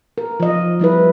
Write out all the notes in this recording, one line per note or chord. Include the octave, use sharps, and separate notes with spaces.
A#4
F3 D#5
F3 G3 E4 B4